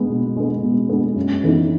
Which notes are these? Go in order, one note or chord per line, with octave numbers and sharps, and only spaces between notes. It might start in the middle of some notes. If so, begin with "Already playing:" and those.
Already playing: G#3 B3
B2
G#3 B3
B2
G#3 B3
F#2
E3 B3 D#4